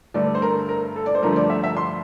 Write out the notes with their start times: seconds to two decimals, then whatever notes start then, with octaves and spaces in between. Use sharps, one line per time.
0.14 G2 D3 A3 D5
0.35 C5
0.42 A#4
0.69 A#4
0.96 A4
1.06 D5
1.15 C5
1.22 G2 D3 F3 A3 A#4
1.33 C5
1.36 D5
1.50 E5
1.64 E5
1.77 C6